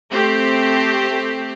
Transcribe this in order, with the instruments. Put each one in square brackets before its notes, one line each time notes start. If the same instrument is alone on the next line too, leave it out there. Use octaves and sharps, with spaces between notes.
[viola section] A3 C4 G4 C5